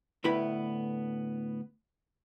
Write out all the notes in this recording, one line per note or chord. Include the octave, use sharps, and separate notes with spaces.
D2 A2 B3 E4 B4 B5